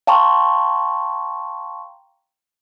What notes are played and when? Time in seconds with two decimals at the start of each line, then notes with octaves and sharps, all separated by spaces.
0.07 F5 G5 A5 A#5 C6 C#6